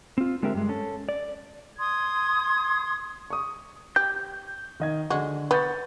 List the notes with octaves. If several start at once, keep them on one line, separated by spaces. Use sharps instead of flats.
C4 F4
D3 G#3 C4 G4 A#4 E5
G2 G#3
C#4 A4
D5
C6 D#6 G#6
C#6 D#6
G4 G6
D#3 D#5 G#6
D3 G#3 F#4
B3 C#6 G6 A6